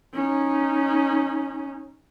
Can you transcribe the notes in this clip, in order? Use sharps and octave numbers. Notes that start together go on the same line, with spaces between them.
C#4 D#4